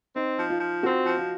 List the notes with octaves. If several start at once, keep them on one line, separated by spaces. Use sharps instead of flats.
C4 D#4
F3
F4
F3
C4 F#4
F3
F4